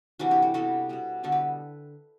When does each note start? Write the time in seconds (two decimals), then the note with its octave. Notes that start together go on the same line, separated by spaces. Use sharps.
0.19 C3 E3 G3 D4 F#4
0.31 E4 G4
0.42 F#4 A4
0.54 C3 G3 B3 F#4 A4
0.89 B2 G3 B3
1.23 D3 G3 B3 F#4 A4
1.32 G4 B4